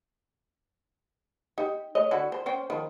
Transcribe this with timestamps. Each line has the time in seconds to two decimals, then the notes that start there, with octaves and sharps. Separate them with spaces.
1.58 D#4 G4
1.95 A3 C#5 D#5
2.11 D3 E4 F#4
2.32 C5
2.46 C#4 C5 G5
2.70 D#3 F3